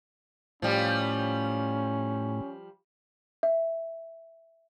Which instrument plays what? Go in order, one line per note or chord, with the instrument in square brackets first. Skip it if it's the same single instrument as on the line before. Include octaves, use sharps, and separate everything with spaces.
[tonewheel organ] A2 [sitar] F3 G3 [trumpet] C#4
[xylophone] E5